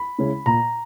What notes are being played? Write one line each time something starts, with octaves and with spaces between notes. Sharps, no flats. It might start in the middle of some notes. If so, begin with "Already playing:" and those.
Already playing: B5
C#3 G#3 C#4 E4
A#2 A#5